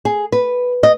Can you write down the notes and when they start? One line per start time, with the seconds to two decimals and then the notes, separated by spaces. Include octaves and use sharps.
0.05 G#4
0.32 B4
0.83 D#5